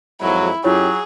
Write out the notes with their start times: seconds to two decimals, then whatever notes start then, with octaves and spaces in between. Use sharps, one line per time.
0.21 G#1 F2 F#3 E4
0.64 F#2 F#3 E4 F4 G4 G#4 C#5